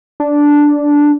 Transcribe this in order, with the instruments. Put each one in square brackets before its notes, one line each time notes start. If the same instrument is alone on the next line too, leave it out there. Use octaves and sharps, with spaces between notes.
[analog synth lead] D4